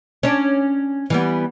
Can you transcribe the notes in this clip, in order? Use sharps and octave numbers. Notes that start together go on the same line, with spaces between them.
C#4 D4
E3 G3 B3